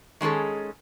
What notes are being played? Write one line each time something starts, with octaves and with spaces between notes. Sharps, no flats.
D#3 G#3 C#4 G#4 A4